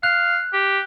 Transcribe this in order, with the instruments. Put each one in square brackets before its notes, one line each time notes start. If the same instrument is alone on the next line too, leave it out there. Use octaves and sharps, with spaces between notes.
[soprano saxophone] F5 [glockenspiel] F#6
[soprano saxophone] G4